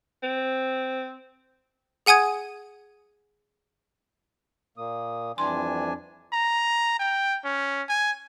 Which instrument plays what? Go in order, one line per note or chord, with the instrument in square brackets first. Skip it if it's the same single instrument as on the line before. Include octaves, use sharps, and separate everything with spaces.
[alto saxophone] C4
[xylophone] G#4 F#5 G#5 D#6 G#6
[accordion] A#2 A#3 D#6
[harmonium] F2 D4 G#5 [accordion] E3 G3 [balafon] C6
[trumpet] A#5
G5
C#4
G#5